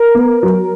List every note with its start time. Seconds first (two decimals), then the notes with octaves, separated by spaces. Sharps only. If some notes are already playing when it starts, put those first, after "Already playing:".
Already playing: A#4
0.15 B3
0.43 F#3